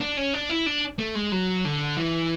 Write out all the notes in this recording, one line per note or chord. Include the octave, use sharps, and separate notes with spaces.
D4
C#4
D4
E4
D4
A3
G#3
F#3
D3
E3